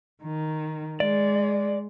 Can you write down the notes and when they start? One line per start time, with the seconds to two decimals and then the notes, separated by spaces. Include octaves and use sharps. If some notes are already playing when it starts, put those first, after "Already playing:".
0.24 D#3
1.00 G#3 D5